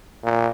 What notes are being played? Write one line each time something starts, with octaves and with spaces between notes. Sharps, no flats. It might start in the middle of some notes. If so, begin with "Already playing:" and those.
A#2